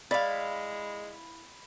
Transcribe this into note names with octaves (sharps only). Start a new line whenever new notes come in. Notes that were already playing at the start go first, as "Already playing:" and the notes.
G#3 E4 D5 F5 B5